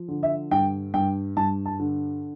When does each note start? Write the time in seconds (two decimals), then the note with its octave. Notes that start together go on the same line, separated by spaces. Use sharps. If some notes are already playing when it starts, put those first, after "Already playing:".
Already playing: F3
0.08 D3
0.23 E5
0.51 G2 G5
0.94 G2 G5
1.37 G2 A5
1.66 A5
1.80 D3